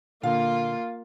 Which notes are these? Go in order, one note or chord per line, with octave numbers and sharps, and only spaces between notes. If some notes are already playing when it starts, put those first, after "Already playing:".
A#2 D3 A#3 F4 F5